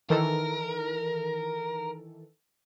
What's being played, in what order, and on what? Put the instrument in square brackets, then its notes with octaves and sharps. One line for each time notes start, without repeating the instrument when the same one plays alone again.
[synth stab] D#3 E3 A4 [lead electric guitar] A#4